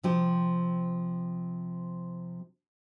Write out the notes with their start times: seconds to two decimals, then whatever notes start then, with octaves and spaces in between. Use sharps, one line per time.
0.03 C3 F3 G4